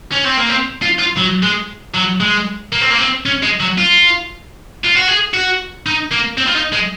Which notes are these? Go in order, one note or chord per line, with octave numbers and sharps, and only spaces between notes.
C#4
C4
A#3
C4
F4
F4
F#3
G#3
F#3
G#3
A#3
C4
A#3
C4
C#4
G#3
F#3
F4
F4
F#4
G#4
F#4
D#4
A#3
C4
F4
D#4
G#3